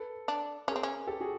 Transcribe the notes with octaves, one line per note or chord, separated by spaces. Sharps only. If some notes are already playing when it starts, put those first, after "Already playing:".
Already playing: A4 B4
D4
C#4 G#4 A#4
C4
C#4
G4 A4
F#4 G#4